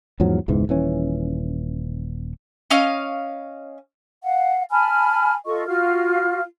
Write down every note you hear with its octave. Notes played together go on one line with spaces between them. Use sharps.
E2 G#2 F3 F#3
E1 C#2 G#2 E3
D#1 E3 C#4
C#4 D#5 F5 F6
F5 F#5
G#5 A5 B5 F6
F4 A4 D#5 C#6
F4 F#4 F5 F6